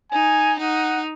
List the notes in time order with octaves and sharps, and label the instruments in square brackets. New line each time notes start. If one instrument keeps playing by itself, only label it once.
[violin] D#4 [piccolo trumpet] G#5
[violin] D#4 [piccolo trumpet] F#5